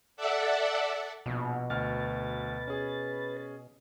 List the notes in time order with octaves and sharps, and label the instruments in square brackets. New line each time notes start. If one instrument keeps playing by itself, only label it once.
[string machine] A4 D5 E5 F#5
[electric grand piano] A#1 [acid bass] B2
[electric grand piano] D2 F6 [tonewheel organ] B4 A6
[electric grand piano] C#4 G#4